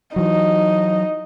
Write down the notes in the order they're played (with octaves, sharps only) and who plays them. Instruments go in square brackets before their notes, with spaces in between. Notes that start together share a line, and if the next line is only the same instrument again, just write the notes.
[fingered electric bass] E3 F#3 [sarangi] D#4